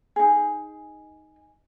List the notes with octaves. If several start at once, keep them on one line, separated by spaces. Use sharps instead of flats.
D#4 G#4